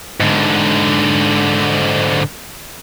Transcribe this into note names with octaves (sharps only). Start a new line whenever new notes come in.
G#2 D3